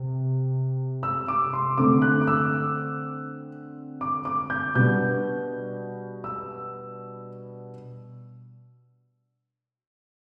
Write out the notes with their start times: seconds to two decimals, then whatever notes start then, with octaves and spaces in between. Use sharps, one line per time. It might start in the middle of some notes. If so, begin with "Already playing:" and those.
Already playing: C3
1.03 E6
1.28 D6
1.53 C6
1.78 D3 A3 C4 D6
2.02 F#6
2.22 D6
2.27 E6
4.01 D6
4.25 D6
4.50 G6
4.75 B2 G3 B3 D4 G6
6.24 E6